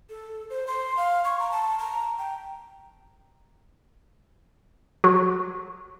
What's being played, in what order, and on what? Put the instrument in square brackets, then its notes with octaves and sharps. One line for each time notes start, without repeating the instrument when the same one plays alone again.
[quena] A4
C5
C6
F5
C#6
A#5
A5
A#5
G5
[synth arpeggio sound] F#3